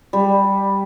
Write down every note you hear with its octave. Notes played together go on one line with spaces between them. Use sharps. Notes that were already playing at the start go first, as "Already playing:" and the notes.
G3